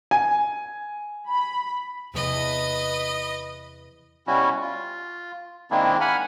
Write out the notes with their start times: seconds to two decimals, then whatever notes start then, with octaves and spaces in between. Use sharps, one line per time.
0.11 G#5
1.29 B5
2.14 E2 C3 B4 D#5
4.27 B2 G3 C#4 E4 F#4
4.62 F4
5.71 D#3 G#3 A#3 C4 D4 E4
6.01 F#5 G#5 B5 F6